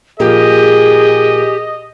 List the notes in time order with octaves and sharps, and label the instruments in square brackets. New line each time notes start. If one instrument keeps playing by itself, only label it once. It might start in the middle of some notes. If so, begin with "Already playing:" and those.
[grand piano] A#2 F3 A#3 [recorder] G4 [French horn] G#4 [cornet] D#5